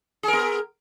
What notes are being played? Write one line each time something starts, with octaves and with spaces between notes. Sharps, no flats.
B3 G#4 A#4